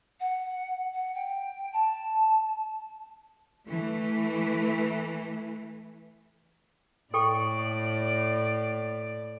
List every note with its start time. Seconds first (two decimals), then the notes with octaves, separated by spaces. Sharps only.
0.20 F#5
0.93 F#5
1.14 G5
1.72 A5
3.68 E3 A3
7.14 A2 A4 D5 G5 C#6